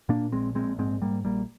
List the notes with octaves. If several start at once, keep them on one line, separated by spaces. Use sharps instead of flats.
A#2 A#3 D4
A#1 G#3 C4
A#1 G#3 C4
G#2 G#3 C4
G#2 G3 A#3
A#1 G3 A#3